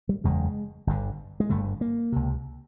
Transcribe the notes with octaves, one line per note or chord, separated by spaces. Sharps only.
G3
F#1 E2 C#3 G#3
G1 G2 D3
G#3
G1 G2 D3 A3
A#3
C#2 C3